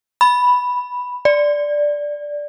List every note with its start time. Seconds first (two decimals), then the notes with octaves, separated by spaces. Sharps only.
0.21 B5
1.25 D5